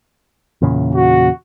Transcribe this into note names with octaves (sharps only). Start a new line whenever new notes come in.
E2 A#2 C#3
F#4